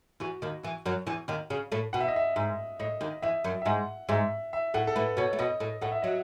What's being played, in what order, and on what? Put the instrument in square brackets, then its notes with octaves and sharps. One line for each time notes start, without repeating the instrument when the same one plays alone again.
[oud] E2 E3 [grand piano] F#4
[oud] D#2 D#3
E2 E3
F#2 F#3
E2 E3
D#2 D#3
C#3
A2 A3
[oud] B2 [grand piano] F#5
[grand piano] E5
D#5
E5
[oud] G#2
[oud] A2 [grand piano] D#5
[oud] D#2 D#3
[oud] E2 E3 [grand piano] E5
[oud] F#2 F#3
[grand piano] E5
[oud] G#2 G#3 [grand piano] F#5
[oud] G#2 G#3 [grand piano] E5
[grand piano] E5
[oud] A2 A3 [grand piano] F#5
[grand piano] A4
[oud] A2 A3 [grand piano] B4
[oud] B2 B3 [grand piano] C#5
[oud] A3
[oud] B2 B3 [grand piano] D#5
[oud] A2 A3
[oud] A2 A3 [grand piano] F#5
[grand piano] E5
[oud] F#3 [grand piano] D#5